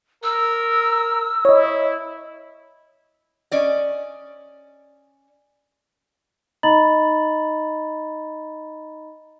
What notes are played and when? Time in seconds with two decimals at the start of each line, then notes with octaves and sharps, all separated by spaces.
0.24 A#4 E6
1.45 E4 C#5 D#5
3.51 C#4 D5 D#5
6.63 D#4 D#5 A#5 B5 A6 F#7